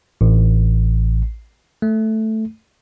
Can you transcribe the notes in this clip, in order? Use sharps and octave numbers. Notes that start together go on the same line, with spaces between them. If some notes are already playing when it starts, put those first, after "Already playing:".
A1
A3